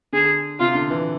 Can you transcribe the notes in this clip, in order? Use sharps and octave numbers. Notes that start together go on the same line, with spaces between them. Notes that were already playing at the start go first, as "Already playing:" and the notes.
D3 G#4
C3 F4
D3
E3